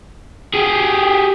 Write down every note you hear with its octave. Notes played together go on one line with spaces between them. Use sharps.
G4 G#4